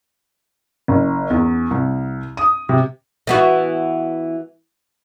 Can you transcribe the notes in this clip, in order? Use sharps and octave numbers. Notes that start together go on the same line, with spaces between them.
F#1
E2
C2
D#6
C3
E3 B3 F#4